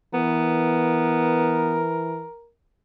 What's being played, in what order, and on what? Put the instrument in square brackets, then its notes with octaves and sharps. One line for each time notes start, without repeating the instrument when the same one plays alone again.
[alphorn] E3 [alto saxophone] B3 [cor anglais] A#4